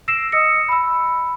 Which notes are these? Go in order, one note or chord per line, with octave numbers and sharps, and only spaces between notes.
E6 A#6 C7 D7 E7
D#5 D#6 E6 A#6 C#7
B5 E6